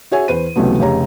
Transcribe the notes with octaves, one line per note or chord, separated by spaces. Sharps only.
F#4 G#4 C#5 E5 G#5
E2 B4 C5 D#7
C#2 C3 E3 F#3 A3 B3
F1 C#3 G4 C#5 A#5